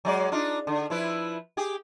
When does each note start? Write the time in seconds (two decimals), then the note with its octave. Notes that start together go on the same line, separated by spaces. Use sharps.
0.05 F#3 G#3 D5
0.32 D4 D#4 F4
0.67 D3
0.90 F3 E4 B4
1.57 G4 G#4